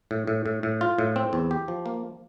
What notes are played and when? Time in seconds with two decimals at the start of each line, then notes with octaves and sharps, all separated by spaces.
0.11 A2
0.27 A2
0.46 A2
0.63 A2
0.81 F4
0.98 A2
1.16 C4
1.33 E2
1.51 G4
1.68 F3
1.86 A#3